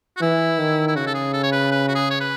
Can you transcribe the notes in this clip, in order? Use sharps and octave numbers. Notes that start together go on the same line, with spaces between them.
F#4
E3 E4
D#3
E4
C#3 F#4
A4
G#4
A4
C#5
B4
B4
F#4
G#4
C#5
B4